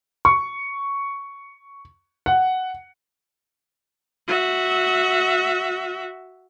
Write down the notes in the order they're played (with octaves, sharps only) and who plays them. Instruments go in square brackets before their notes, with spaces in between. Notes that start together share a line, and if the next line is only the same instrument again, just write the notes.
[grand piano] C#6
F#5
[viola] F#4 E5